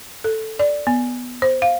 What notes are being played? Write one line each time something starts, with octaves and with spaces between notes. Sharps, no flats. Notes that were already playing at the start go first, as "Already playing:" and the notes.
A4
D5
B3
C5
F5